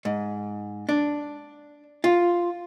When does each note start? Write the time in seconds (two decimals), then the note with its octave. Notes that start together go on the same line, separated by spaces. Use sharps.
0.05 G#2
0.89 D4
2.04 F4